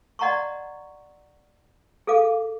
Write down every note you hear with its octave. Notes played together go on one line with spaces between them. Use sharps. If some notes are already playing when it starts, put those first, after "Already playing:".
D5 D#5 F#5 A#5 C6 C#6
G#4 A4 F5 D6